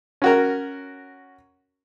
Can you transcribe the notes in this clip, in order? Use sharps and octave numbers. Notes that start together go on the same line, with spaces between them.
C#4 F#4 A#4